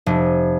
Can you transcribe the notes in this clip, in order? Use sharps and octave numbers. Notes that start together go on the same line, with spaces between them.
F1